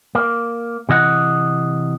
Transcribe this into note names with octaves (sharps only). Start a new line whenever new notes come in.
A#3
C3 E3 D#5 F#5